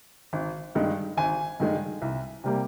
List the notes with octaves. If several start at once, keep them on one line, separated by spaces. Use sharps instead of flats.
G#1
G2 D#3 G#3
G#1 G#5
G2 D#3 G#3
C2
C3 G3 A#3